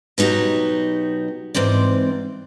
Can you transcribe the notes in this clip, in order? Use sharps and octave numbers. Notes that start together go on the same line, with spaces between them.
B2 F#3 D#4 F#4 G4
G#2 E3 C4 D5